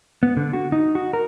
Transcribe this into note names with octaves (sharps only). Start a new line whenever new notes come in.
B3
D3
F#4
D#4
F#4
A#4